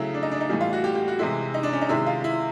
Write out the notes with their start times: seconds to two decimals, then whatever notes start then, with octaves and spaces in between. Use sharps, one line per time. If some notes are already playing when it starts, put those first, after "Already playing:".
Already playing: C#3 F#3 A3 E4
0.14 D4
0.23 D#4
0.31 D4
0.41 D#4
0.49 A2 E3 G3
0.61 F4
0.73 F#4
0.84 G4
0.95 G4
1.08 F#4
1.19 C3 E3 G#3 E4
1.54 D#4
1.63 D4
1.73 C#4
1.81 D#4
1.89 C3 D#3 G#3 E4
2.07 F4
2.24 E4